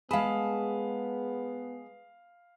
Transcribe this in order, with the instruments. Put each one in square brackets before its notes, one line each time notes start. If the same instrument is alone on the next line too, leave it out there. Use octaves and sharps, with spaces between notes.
[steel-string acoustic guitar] G#3 A5 [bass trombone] B3 [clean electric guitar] G#4 [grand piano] F5 B5